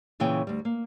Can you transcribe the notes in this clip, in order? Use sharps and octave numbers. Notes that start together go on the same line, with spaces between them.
A#2 C#3 E3 C#5 G5
D2 G3
A#3